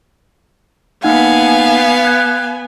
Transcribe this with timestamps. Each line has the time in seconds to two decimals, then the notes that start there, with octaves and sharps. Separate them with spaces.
1.03 A#3 B3 D#4 F5 F#5 G#5
2.05 F#6 G#6